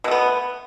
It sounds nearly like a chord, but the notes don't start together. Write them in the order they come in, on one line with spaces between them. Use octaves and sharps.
B2 A3 B3